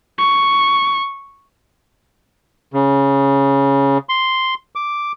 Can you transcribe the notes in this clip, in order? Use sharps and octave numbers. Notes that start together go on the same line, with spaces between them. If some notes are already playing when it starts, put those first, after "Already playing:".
C#6
C#3
C6
D6